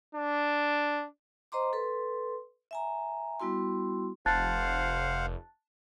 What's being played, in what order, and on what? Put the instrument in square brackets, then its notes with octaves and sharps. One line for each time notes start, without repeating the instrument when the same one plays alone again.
[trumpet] D4
[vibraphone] C5 D#5 A#5 C6 D6
A4 B4 C6
E5 G#5 A#5
G3 B3 E4 F#4 C6
[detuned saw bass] F1 [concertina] C5 F5 F#5 [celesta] A5 F#6 A6